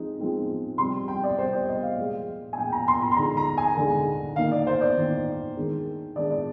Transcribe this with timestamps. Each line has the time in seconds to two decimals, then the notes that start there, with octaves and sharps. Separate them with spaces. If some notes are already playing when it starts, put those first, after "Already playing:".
Already playing: F3 G#3 C4 D#4
0.19 F3 G#3 C4 D#4
0.78 C3 G3 C4 C6
1.08 G5
1.24 D5
1.38 C3 G3 C4 C5
1.53 D5
1.68 D#5
1.83 F5
1.98 A#2 F3 G#3
2.53 G#5
2.57 A#2 F3 G#3 G5
2.72 A#5
2.88 C6
3.02 A#5
3.11 C6
3.17 D3 G#3 D#4 A#5
3.37 A#5
3.58 G#5
3.77 D3 G#3 D#4
4.36 D#3 A#3 D#4 F5
4.51 D5
4.67 C5
4.81 D5
4.96 D#3 A#3 D#4
5.55 D#3 G#3 D4
6.16 D#3 G#3 D4 D5
6.31 D5